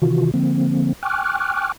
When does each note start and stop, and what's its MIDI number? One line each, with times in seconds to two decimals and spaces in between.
0.02 0.31 48
0.02 0.31 51
0.02 0.31 52
0.02 0.31 65
0.02 0.31 66
0.34 0.93 50
0.34 0.93 53
0.34 0.93 58
0.34 0.93 60
1.03 1.72 79
1.03 1.72 80
1.03 1.72 85
1.03 1.72 86
1.03 1.72 89
1.03 1.72 90